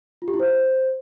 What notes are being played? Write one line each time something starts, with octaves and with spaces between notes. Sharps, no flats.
F4
G4
E4
C5